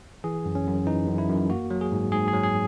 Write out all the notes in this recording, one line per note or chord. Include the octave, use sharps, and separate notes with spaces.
E3 G#4
F#2
C#4
F#2
E3 D#4
F#2
E4
F#2
A#3 F#4
F#3
G#4
G#2
G#2 G#4
G#4
F#3
G#4